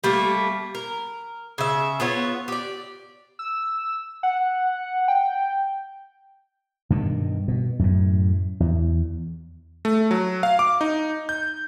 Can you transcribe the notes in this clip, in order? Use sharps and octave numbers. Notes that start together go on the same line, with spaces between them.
G3 A3 A#3
A#4
C#3 E5
B3 F4 C#5
G4 D5
E6
F#5
G5
G2 B2 D#3
B2
F#2 A2
E2
A3
F#3
F5
D6
D#4
G6